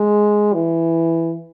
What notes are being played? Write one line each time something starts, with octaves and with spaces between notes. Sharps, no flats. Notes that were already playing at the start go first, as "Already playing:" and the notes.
Already playing: G#3
E3